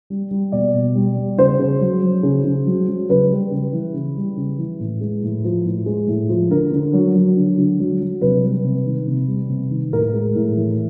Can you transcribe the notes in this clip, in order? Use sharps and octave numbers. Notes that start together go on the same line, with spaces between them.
G3
G3
B2 D5
B2
G3
G3
C#3 C5
C#3
F#3
F#3
C#3
C#3
F#3
F#3
C#3 B4
G3
C#3
E3
C#3
G3
C#3
E3
A2
G#3
A2
F3
A2
G#3
A2
F3
D3 A#4
D3
F#3
F#3
D3
D3
F#3
F#3
C3 B4
G3
C3
D#3
C3
G3
C3
D#3
A2 A#4
G#3
A2
E3